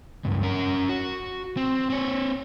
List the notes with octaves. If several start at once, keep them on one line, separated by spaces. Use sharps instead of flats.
C#2 G2
C#4 A#4
F#4
C4
C4 C#5